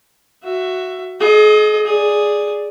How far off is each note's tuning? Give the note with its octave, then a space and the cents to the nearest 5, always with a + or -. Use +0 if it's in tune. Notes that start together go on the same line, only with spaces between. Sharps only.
F#4 +0 E5 +15
G#4 +40 D#5 +0
G#4 +0 D5 +0